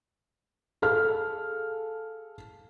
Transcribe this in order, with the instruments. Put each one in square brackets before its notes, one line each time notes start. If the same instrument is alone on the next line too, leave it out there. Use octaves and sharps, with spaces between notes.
[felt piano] G#4 A4 F5 F6